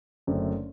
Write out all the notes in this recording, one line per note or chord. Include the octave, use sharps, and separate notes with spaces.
F#1 F#2 D3 A3 C4